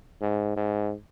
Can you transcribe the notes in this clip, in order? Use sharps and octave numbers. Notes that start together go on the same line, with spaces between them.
G#2
G#2